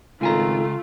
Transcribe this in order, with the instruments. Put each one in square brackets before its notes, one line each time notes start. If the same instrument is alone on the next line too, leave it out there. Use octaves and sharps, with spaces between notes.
[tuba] G#1 [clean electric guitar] C#2 G#5 A#5 [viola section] A3 [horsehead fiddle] F4